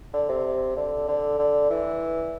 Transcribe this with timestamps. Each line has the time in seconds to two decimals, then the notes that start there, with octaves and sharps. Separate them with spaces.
0.14 D3
0.29 C3
0.76 D3
1.08 D3
1.39 D3
1.70 E3